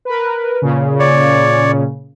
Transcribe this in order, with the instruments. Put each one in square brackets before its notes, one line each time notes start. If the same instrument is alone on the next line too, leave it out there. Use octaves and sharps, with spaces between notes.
[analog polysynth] A#4 B4
A#2 C#3
[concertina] C#5 D5